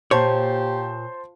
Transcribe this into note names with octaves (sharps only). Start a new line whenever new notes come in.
A#2 G4 C5 C#5 A5 C6